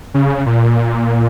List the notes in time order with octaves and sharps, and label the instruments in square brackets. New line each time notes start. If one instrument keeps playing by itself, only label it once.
[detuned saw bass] C#3
A#2